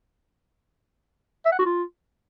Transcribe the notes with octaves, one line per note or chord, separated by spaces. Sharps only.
E5
F#5
F#4
F4